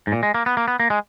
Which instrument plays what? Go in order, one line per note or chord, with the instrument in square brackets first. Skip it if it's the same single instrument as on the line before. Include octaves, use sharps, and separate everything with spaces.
[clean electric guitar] G#2
A#2
G#3
A#3
B3
A#3
B3
A#3
G#3